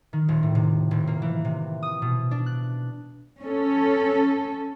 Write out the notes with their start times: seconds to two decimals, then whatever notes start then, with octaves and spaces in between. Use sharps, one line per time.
0.13 D#3
0.29 D#1
0.43 A2
0.55 C3
0.91 D#1
1.07 A#3
1.22 E3
1.45 C3
1.83 D#6
2.02 B2
2.31 D4
2.46 F#6
3.41 C#4 A4